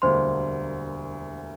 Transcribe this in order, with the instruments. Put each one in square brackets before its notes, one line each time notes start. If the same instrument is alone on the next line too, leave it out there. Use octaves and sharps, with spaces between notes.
[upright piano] E1 D2 D3 G3 A#3 [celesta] C5 C6